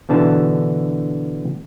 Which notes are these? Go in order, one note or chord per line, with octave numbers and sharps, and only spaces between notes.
B2 D3 E3 A5